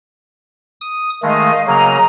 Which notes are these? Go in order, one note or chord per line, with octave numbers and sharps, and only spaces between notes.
D#6
D#3 G#3 A3 D#5 F5
C#3 F#3 A#3 D#5 A#5